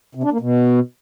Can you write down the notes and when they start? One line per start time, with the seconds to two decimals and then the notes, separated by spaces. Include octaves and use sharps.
0.15 C3
0.23 D4
0.32 A#3
0.40 B2